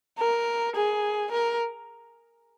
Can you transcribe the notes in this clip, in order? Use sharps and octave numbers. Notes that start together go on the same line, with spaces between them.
A#4
G#4
A#4